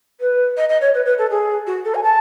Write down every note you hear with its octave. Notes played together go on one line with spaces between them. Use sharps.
B4
D#5
D#5
C#5
B4
B4
A4
G#4
F#4
A4
G#5
A5